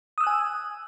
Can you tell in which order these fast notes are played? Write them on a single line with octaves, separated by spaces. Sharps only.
D#6 E6 F#6 G#5